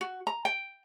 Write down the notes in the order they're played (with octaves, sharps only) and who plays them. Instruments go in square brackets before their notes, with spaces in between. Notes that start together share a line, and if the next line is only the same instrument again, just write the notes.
[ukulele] F#4
A#5
G5